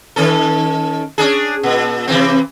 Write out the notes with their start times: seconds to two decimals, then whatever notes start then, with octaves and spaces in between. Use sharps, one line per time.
0.16 D#3 C#4 A4
1.18 C#4 D4 G#4
1.63 A#2
2.08 C3 E3 C4